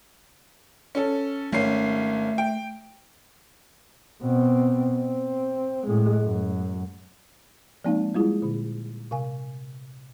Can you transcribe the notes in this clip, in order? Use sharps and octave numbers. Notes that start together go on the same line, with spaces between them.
C#4 A4
G#1 A3 C#4 C7
G5
B2 C4
C4
A2 G#3
F#2
F3 G#3 A#3 C4 D#4 F5
G3 G#3 E4 F4 G#4
A#2 D3
C3 F5 G#5